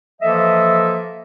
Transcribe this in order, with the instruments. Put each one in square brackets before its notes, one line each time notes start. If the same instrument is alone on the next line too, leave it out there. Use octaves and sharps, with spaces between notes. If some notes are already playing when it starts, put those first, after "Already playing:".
[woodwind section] E3 F3 A#3 A4 D#5 E5